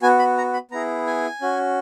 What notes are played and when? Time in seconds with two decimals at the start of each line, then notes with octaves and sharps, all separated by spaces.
0.02 B3 F#4 G#5
0.19 B5
0.37 A#5
0.54 B5
0.71 B3 E4 G#4 A#5
1.07 G#5
1.41 C#4 F#4